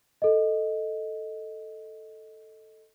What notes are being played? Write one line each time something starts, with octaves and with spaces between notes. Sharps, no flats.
A4 D#5